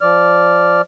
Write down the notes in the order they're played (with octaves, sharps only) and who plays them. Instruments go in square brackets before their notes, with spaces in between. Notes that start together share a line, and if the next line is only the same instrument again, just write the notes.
[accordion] F3 D5 F6